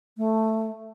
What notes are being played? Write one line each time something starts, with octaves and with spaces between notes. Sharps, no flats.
A3